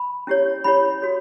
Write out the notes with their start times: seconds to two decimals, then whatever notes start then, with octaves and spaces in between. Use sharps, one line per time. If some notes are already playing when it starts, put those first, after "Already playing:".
Already playing: B5
0.27 C#4 E4 G4 C#5
0.64 C#4 E4 G4 C#5 B5
1.02 F#4 A4 C#5